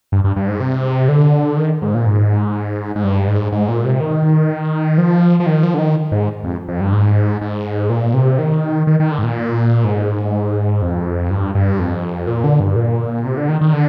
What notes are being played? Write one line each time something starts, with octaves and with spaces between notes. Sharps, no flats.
G2
G2
G2
G#2
C3
D3
D#3
G#2
A#2
G#2
G#2
G2
G#2
G#2
A#2
C3
D#3
F3
F3
D#3
F3
D3
D#3
G#2
F2
F2
G2
G#2
G#2
A#2
C3
D#3
D#3
D#3
D3
G#2
A#2
G#2
F2
G2
G2
F2
A#2
D3
G2
A#2
C3
D3
D#3
D#3
D3